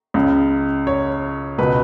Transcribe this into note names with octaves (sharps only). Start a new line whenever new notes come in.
C#2 C#3
C#5
C#2 B2 B4